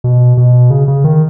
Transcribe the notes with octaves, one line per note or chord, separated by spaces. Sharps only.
B2
B2
C#3
C#3
D#3